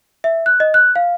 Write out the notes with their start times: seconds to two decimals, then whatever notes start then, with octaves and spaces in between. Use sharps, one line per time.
0.24 E5
0.46 F#6
0.60 D#5
0.74 F#6
0.96 F5